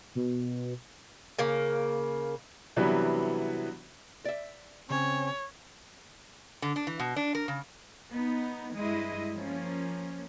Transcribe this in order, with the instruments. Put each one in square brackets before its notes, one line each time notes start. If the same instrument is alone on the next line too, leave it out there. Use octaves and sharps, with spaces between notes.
[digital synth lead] B2
[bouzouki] C#3 A#3
[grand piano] C3 E3 F#3 G3 B3 D4
[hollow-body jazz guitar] D5 E5
[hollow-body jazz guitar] C#3 [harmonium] C4 C#4 [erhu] C#5
[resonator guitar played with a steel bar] D3
D4
E3
B2
D4
A#4
C#3
[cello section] B3 D#4
G2 G#3 E4 D#5
F3 A#3 C#4